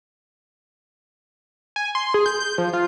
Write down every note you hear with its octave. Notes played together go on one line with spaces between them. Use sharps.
G#5
C6
G#4
G6
G6
F3
F4